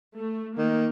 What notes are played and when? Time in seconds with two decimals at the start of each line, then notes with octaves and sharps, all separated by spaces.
0.18 A3
0.58 D#3 A#3